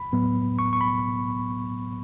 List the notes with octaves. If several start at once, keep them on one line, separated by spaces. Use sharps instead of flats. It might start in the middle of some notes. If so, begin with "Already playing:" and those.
Already playing: B5
A2 F#3 B3
C#6
C#6
B5